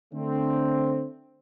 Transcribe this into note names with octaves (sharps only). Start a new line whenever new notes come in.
D3 A3 C4